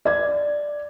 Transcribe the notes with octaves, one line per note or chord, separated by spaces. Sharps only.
D5 G#6